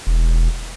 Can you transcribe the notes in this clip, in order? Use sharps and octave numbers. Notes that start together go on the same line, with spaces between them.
E1